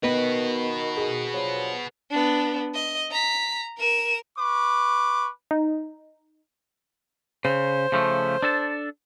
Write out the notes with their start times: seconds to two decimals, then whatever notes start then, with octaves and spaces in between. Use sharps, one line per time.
0.03 D#3 B3 F#4 B4
0.97 G#4
1.34 G2 F3 F#3
2.11 B3 D4
2.74 D#5
3.11 A#5 B6
3.78 A#4 E7
4.38 B4 C#6 D6
5.51 D#4
7.45 C#3 C5
7.92 C#3 F3 A3
8.42 D4 A4 A5